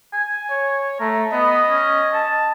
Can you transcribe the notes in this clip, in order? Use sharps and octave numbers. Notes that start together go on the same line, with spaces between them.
G#5
C#5
A3 A#5
B3 D#5
C#4
A5